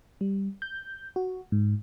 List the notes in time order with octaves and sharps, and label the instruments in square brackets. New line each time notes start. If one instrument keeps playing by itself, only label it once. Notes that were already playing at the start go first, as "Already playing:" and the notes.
[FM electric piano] G3
G6
F#4
G#2